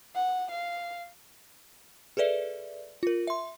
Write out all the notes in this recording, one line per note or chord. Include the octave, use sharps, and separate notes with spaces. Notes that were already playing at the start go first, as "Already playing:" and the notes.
F#5
F5
G#4 A4 B4 D5 E5
F4 A#4
E5 C6